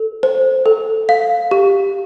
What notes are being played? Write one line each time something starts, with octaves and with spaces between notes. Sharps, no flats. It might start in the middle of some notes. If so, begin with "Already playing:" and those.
Already playing: A4
C5
A4
F5
G4